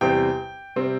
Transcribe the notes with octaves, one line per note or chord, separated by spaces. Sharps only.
E2 C3 G3 C4 G5
C3 G3 C4